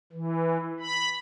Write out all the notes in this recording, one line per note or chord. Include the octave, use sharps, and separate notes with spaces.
E3
B5